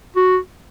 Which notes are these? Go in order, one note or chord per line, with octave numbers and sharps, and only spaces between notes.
F#4